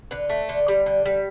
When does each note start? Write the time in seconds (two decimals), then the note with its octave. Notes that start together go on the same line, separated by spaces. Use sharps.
0.11 D3 B4
0.30 A3
0.49 D3
0.68 G3
0.86 D3
1.06 G3